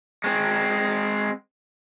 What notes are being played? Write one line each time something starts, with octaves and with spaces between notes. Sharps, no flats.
G#3 C4